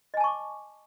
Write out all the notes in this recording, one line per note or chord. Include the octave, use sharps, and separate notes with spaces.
D#5 G#5 A5 C#6 D6